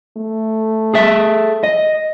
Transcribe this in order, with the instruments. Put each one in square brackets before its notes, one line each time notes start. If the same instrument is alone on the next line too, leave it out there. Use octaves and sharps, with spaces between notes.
[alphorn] A3
[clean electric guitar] G#4 A4 E5
D#5